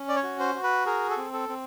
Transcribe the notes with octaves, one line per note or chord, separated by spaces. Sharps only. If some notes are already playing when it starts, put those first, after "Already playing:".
Already playing: C#4
D5
C#5
F#4
C5
F#4
B4
G#4 A#4
A4
C4
A4
C4